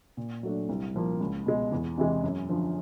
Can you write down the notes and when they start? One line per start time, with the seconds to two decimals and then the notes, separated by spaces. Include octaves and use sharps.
0.17 A#2
0.43 F#3 A3 D4
0.69 C2
0.94 A#2 F3 A#3
1.21 C#2
1.46 B2 G#3
1.72 E2
1.98 C3 E3 G#3
2.23 F#2
2.49 D3 F3